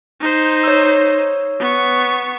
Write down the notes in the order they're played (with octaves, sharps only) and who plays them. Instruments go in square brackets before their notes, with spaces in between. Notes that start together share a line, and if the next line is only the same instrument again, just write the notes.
[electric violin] D#4 C5
[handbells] C#5 E6
[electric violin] B3 C#6